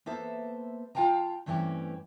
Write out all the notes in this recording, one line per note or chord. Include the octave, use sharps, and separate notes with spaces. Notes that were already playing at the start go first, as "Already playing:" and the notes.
A#3 B3 A4 C5 E5
F4 F5 G5 A5 A#5
G2 E3 A3 C4 C#4 G4